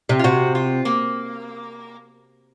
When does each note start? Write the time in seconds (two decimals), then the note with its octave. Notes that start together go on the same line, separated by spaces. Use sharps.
0.09 C3
0.19 F4
0.24 C3 F#4
0.55 F4
0.85 A#3